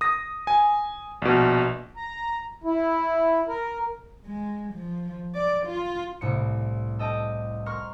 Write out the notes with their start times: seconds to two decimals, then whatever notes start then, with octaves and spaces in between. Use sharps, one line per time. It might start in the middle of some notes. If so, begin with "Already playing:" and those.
0.01 D#6 A#6
0.47 G#5
1.22 A#1 B2
1.96 A#5
2.64 E4
3.48 A#4
4.26 G#3
4.74 F3
5.35 D5
5.67 F4
6.21 C2 A2 C#7
6.99 A4 D#5 G5 A5
7.66 A#4 C6 C#6 F6